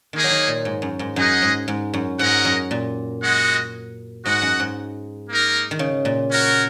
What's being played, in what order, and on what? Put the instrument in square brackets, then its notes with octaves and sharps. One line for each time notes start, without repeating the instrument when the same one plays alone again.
[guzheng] D#3 [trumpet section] A#3 D#4 G#4
[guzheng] F#3
D#3
A#2
G#2
F#2
G#2
[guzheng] F#2 [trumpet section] D#4 G#4 D#5 F#5
[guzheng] G#2
G#2
F#2
[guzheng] G#2 [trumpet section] C#4 A#4 D#5 F#5
[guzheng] F#2
A#2
[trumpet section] G#3 F#4 D#5 F#5
[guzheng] G#2 [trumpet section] F#4 D#5 F#5
[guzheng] F#2
G#2
[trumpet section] A#3 D#4 A#4
[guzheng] D#3
C#3
A#2
[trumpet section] C#4 F#4 A#4